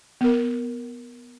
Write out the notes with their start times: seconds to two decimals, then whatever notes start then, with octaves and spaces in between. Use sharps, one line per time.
0.21 B3 A#4